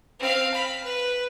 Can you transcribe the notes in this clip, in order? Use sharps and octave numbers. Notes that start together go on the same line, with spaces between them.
C4 F5
B5
B4